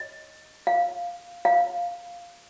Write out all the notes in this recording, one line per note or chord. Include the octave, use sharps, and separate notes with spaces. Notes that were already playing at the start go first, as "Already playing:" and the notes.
Already playing: D#5
F5
F5